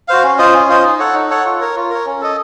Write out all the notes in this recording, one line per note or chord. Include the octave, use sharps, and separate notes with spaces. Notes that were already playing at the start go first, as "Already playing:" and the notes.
F#4 C5 F5
C#4
F4 C5 D#5
C#4
F4 C5 D#5
D#4
A4 C#5 F#5
D#4
A4 C#5 F#5
F4
A#4 C#5
F4
A#4 C#5
C#4
A4 D#5